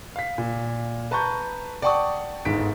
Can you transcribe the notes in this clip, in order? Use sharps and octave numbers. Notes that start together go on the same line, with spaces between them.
F5 B6
A#2
B4 A5 A#5 C#6 G6
D5 F#5 G5 A5 C#6 D#6
G1 G#2 B6 D7